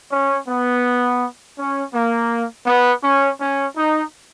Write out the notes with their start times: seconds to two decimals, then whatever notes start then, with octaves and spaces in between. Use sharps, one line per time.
0.11 C#4
0.48 B3
1.58 C#4
1.94 A#3
2.67 B3
3.04 C#4
3.40 C#4
3.77 D#4